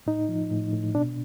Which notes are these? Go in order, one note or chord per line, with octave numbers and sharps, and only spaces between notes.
A2 D#4
F3
A2
A2
B2 D4